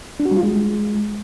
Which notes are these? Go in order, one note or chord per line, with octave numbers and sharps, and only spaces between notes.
D4
F#4
G3
F4
G#3